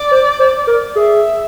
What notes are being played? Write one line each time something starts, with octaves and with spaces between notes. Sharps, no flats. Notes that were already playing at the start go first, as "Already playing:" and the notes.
Already playing: D5
C5
C5
A#4
G#4 E5